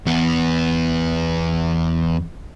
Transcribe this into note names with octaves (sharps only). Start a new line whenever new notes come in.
E2 B3